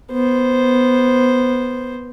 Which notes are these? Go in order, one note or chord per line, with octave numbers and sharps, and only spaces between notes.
B3 C5